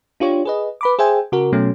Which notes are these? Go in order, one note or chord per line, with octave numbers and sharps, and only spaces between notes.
D4 F4 G4 C#5
G#4 B4 D#5
B4 B5 D6
G#4 C5 E5 G5 G#5
C#3 F#4 A#4
B2 F#3 A3 C#4